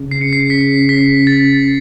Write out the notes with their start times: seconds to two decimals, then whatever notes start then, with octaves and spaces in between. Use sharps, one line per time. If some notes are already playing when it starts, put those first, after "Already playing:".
Already playing: C#3
0.11 C7
0.21 C#7
0.33 C7
0.50 B6 C#7
0.89 B6
1.27 A6